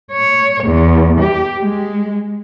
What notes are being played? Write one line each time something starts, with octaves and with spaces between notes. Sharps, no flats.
C#5
E2
G4
G#3